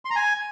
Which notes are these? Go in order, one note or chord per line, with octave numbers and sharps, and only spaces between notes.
C6
A#5
G#5